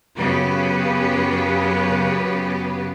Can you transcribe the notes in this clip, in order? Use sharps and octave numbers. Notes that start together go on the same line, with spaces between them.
F#2 C#3 F#3 B3 G4 B4